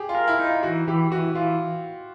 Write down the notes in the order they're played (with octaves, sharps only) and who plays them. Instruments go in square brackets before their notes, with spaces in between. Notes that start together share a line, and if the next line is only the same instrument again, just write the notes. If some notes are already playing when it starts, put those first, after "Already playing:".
Already playing: [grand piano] G4 G#4
F4
[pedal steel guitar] A#4
[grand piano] E4
[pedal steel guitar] D#4
[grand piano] F4
[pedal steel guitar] E3 [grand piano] F#4
[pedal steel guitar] E3 [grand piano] G4
[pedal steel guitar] E3 [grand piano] F#4
[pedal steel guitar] E3 [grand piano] F4